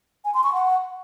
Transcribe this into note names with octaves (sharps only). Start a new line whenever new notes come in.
G#5
C6
C#6
F#5